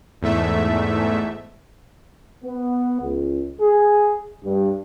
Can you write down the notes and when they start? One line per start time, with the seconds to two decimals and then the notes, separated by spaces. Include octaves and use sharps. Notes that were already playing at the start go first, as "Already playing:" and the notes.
0.21 E2 G#2 A3 E5
2.44 B3
3.01 C#2
3.60 G#4
4.44 G2